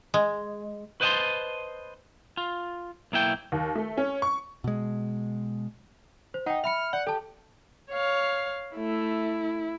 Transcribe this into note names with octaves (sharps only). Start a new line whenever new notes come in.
G#3
B4 C5 D#5 F5 A5 C6
F4
B1 A#3 E4 G5
D#2
A3
C#4
C#6
B2 G#3
C5
D#4 F#5 G5
E5 B5 F6 C#7
D5 F#5
G4 A4 A5
C#5 F5
A3 E4